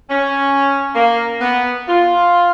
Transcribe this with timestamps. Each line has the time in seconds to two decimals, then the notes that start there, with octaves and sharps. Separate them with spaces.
0.10 C#4
0.95 A#3
1.41 B3
1.88 F4